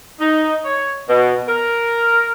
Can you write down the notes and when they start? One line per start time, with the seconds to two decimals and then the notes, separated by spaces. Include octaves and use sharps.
0.20 D#4
0.65 C#5
1.09 B2
1.49 A#4